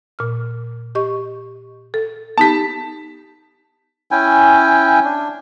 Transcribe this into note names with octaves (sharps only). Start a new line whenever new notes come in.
A#2 F6
G4 D#5 C#6
A4
B3 D#4 G4 A5 B6
C#4 E4 G5 G#5
D4